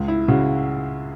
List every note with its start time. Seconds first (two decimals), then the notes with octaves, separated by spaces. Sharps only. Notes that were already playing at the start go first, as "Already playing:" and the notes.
Already playing: C#2
0.08 E4
0.28 C#3 F#4